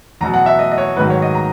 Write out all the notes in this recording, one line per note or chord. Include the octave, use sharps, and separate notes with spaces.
E2 B2 F#3 A#5
F#5
E5
D#5
D#5
C#5
G#2 D#3 F#3 B4
C#5
D#5
A#5